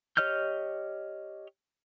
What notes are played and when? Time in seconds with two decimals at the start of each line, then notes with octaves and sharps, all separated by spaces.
0.17 G4 C#5 D#5 F6 G6